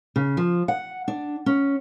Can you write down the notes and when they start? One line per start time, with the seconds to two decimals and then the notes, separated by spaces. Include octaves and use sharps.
0.16 C#3
0.37 F3
0.68 F#5
1.08 D4
1.46 C#4